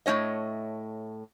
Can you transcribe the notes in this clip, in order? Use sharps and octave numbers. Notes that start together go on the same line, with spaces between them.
A2 A3 C#4 C#5 D#5